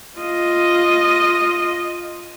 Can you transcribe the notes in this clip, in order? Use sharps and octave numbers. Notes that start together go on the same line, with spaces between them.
F4 D#5